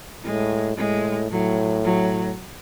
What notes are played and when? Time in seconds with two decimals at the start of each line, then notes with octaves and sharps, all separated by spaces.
0.24 A2 G#3
0.77 A2 G#3
1.31 A2 F#3
1.84 F#3